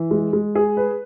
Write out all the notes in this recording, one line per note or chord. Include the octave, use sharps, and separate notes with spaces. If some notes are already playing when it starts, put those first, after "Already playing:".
Already playing: E3
G#3
G#3
G#4
B4